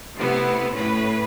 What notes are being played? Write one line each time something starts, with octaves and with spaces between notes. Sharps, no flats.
C3 A3 B3 E4
A2 C#4 B4